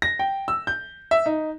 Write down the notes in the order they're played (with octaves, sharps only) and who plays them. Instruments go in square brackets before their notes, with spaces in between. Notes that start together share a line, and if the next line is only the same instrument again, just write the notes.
[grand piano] A#6
G5
E6
G6
E5
D#4